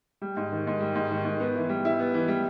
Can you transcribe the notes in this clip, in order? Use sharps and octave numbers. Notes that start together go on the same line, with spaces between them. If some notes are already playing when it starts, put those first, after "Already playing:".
G3
G#2
D#3
G#2
G3
G#2
D#3
G#2
B3
E3
G3
E4
B3
E3
G3